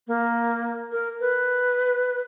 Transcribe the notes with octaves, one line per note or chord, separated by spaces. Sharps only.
A#3
A#4
B4